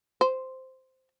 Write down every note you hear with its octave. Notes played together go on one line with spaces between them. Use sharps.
C5